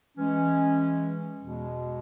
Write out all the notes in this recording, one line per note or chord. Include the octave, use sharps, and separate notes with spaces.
E3 G#3 C#4
E2 B2 G#3